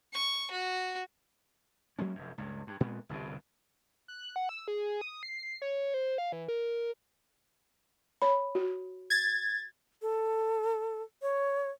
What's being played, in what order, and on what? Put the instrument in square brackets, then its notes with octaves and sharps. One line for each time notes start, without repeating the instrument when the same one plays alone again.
[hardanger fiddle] C#6
F#4
[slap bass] F#3 G#3 A#3 C#4
F1 F#2
C#2 G2
G2
A#2 G#3 B3 C4
G1 C2 G2 B2
[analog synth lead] F#6
F#5
E6
G#4
D#6
C7
C#5
C5
F5
E3
A#4
[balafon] C#5 B5
F#4
[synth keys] G#6 A6
[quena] A4
C#5